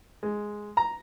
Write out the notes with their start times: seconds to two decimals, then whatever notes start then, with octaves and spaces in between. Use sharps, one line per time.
0.23 G#3
0.77 A#5